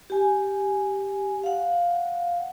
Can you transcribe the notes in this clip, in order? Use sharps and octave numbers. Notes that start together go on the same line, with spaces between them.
G4 G#5
F5 F#5